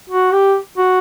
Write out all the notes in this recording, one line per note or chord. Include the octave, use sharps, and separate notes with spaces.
F#4
G4
F#4